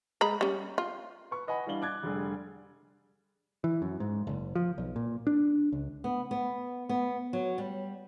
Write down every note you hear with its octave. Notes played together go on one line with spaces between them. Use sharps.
G#3 A#5 B5
G3 C#4
F4
B4 C#6
B4 D#5 F#5 G#5 B5
E3 G3 D4 F5 F#7 G7
D6 F#6 G#6 A6
F1 D3 G3 G#4
E3
F#2
G#2
F#1
F3
B1
A#2
D4
C#2
B3
B3
B3
F#3
G3